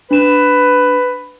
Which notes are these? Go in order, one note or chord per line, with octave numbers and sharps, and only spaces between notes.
D4 B4 E7